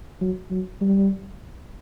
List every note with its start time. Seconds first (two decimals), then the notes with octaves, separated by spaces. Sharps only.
0.21 F#3
0.50 F#3
0.81 G3